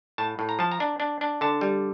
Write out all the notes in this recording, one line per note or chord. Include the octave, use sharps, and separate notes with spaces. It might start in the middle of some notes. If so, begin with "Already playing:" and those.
A2 A5
A2
A#5
F3 A5
A#5
D4
D4
D4
D3 A5
G3